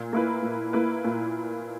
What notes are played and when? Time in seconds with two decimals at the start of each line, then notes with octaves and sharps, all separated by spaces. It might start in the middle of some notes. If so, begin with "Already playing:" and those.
Already playing: A#2
0.13 A#3 E4 B4
0.42 A#2
0.73 A#3 E4 B4
1.04 A#2